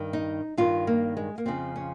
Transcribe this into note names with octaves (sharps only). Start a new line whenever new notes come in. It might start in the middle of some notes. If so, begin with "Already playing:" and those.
Already playing: G2 D#3
D#4
G2 D#3 F4
A#3
G#3
A#3
F2 C#3 F3 C4
C#4